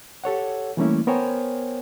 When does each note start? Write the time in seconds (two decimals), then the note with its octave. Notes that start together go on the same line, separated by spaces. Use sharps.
0.24 G4 A4 C#5 F#5
0.77 E3 G3 A3 A#3 C#4 E4
1.07 B3 A#4 C5 C#5 G5 G#5